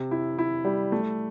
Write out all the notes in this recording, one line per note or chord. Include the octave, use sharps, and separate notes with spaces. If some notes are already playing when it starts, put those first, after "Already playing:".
Already playing: C3
E4
E4
G3
A3